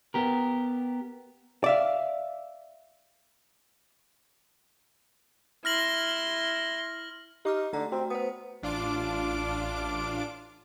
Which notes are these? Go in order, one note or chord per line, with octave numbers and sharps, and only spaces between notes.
B3 G4 A#4
D5 E5 F5
E4 C6 F6 A#6 F#7
D#4 G4 D6 F6
D3 A3 A#5
C4 F#4
B3 C5 D#6
A1 D4 F4 D6 D7